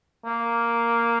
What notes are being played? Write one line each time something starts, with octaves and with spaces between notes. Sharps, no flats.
A#3